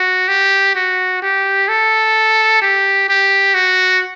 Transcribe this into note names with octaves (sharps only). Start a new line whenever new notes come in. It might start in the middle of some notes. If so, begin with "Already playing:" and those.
Already playing: F#4
G4
F#4
G4
A4
G4
G4
F#4